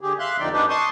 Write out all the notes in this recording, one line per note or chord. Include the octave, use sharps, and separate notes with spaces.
D3 G4 G#4
E5 F5 C6 F#6
E2 D3 F3 D#4 D5 G5
F#2 G3 D4 D#4 G4 B4
A5 C6 C#6 D#6